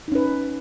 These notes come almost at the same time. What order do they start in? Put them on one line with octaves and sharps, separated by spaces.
D#4 C#4 B4